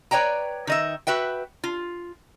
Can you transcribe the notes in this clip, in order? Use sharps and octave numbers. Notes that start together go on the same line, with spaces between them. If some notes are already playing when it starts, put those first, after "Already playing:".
B4 C#5 D5 G5 A#5
D#3 D#5 E5
F#4 B4 E5 G5
F4